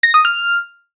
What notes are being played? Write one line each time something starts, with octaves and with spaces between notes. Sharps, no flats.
A#6
D#6
F6